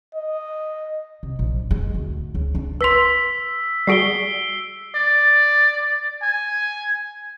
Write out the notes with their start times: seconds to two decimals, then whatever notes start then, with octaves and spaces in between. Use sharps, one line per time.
0.15 D#5
1.23 C2
1.39 A#1
1.71 G#3
1.94 D2
2.35 C#2
2.55 D4
2.81 B4 C6 E6 B6
3.87 G3 F#4 G#4 C7 D7 G7
4.95 D5
6.23 G#5